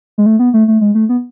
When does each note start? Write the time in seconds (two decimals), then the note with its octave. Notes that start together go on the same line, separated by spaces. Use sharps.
0.18 G#3
0.26 A3
0.39 B3
0.54 A3
0.68 A3
0.81 G#3
0.95 A3
1.09 B3